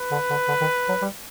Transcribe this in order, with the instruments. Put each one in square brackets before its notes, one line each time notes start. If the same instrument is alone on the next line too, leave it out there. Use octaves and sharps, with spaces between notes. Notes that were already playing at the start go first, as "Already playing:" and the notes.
Already playing: [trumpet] B4
[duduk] D3
D3
D3
D#3
F#3
G3